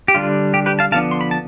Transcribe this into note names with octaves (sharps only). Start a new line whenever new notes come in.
G4
D3 G3 D4 F4
G4
G4 B4
F5 A5
D3 F3 B3 D4 F5 A5
C6
B5
A5